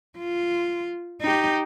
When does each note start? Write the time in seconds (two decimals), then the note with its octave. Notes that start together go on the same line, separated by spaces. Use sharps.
0.19 F4
1.22 D#4 G4